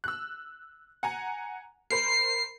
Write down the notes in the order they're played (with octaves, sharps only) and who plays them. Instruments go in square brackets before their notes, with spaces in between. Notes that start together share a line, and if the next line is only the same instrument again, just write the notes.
[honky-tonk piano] E6 F#6
F#5 G#5 A#5
[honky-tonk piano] A#4 C5 B5 [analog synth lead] C7